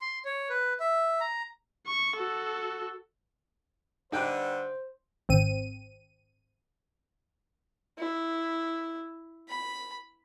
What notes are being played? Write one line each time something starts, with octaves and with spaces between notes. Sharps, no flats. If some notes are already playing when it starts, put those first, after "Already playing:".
C6
C#5
B4
E5
A#5
C#6
F#4 A4
G2 D3 D#4 C5 G5 F#6
G#1 C4 D#7
E4
B5